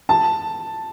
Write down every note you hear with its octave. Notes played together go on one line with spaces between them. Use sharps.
A5